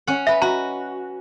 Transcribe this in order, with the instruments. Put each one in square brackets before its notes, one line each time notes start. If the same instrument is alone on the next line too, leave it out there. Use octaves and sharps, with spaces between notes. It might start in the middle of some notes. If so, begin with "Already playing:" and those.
[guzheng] C#4 F#5
[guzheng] B4 D#5 [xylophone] E5
[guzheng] F#4 [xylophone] A#5